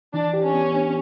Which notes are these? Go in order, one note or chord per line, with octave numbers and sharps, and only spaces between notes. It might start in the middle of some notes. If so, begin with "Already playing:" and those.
E3 D4
G4
C#4
B3
D4